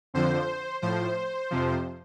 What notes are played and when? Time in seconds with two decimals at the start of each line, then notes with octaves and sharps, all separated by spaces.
0.14 F2 D3 F3 C5
0.82 A2 F3 C5
1.51 F2 C3 F3